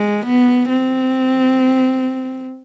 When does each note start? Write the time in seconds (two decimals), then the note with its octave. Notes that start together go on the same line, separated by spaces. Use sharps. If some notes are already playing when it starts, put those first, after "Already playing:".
Already playing: G#3
0.26 B3
0.69 C4